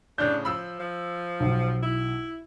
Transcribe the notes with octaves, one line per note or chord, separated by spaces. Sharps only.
A2 C#3 D4 G6
F3 B5 E6
F3
B1
E4